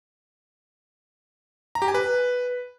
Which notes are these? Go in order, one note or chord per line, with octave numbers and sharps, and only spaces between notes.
A#5
G4
G#5
B4